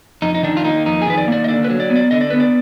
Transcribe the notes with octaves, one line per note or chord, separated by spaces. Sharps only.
F2 D#4
D#4
D#3 D4
F4
A#3 D#4
F2 D#4
G#4
D#3 B4
D5
A#3 D5
D#5
D3 D5
B4
F#3
D5
B3
D5
D3 D#5
D5
B3 B4
D5